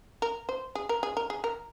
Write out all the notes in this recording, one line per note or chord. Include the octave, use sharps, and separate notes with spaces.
A#4
C5
G#4
A#4
G#4
A#4
G#4
A#4